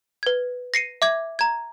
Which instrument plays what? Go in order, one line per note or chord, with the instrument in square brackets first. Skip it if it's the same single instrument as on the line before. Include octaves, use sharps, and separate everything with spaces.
[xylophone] B4 G#6
A#6 C7 C#7 D#7
E5 D6 G#6
A#5 G#6